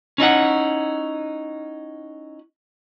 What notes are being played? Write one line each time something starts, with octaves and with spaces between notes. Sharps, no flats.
C#4 D#4 E4 F#5